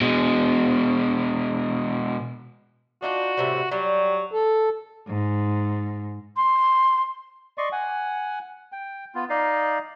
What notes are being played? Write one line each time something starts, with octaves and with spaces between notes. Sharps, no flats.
B2 G#3
D4 D#4 F4 F#4
A2 C3 G3
F#3 G3
A4
G#2
C6
D5 D#5 C6 C#6
F#5 G#5
G5
B3 F4
D#4 D5 D#5 F5